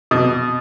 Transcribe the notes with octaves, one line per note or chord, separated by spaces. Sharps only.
B2